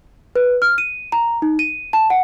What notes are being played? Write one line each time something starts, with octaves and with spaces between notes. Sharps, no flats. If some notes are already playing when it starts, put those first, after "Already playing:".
B4
F6
D#7
A#5
D#4
D#7
A5
F#5